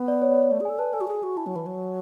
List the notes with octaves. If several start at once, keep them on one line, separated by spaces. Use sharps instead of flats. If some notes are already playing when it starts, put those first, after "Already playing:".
Already playing: B3
D5
C#5
D5
C#5
A3 D5
G#4 G#5
A4
B4 A5
A4 G#5
F#4
G#4 G#5
F#4
E4 A5
F#3 G#5
E3
F#3